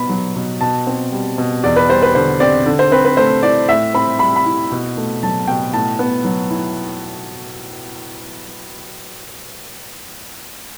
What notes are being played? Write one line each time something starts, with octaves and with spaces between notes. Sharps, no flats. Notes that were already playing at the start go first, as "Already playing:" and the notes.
Already playing: B2 B3 B5
F#3
B2
B2 A5
C4
G3
B2
E2 D5
B4
G3 C5
B4
D3 C5
C4 D5
D3
C5
C4 B4
B4
A3 C5
E4 D5
A2 E5
C4 B5
G3 B5
B5
E4
B2
A3
F#3 A5
B2 G5
A2 A5
B3
F#3
E4